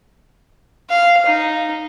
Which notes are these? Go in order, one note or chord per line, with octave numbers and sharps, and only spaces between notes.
F5
D#4